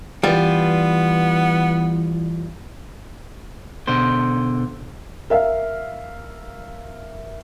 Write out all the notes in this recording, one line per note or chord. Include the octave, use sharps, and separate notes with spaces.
E3 G3 B3 F4 B4
B2 D3 C5
A#4 E5 F5